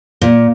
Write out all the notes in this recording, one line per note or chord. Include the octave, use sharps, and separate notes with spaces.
A#2